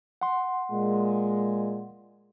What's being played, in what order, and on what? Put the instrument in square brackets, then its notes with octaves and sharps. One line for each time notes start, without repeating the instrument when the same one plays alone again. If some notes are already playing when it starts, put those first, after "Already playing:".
[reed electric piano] F#5 C6
[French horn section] A#2 G#3